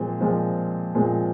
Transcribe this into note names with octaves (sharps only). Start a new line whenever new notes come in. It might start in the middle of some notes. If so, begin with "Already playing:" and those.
Already playing: A#2 F3 G#3 C4
A#2 F3 G#3 C4
A#2 F3 G#3 C4